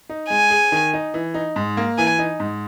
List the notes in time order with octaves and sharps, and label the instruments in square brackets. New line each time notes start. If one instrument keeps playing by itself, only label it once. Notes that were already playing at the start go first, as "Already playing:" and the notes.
[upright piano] D#4
[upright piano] G#3 [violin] G#5
[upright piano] G#4
D#3
D#4
E3
D#4
G#2
A#3
[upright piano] E3 [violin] G#5
[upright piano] D#4
G#2